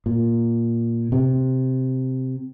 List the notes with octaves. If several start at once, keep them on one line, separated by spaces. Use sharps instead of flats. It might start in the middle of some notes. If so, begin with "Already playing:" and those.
A#2
C3